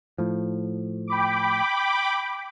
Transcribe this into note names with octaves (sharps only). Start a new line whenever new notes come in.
A2 F3
G5 B5 D6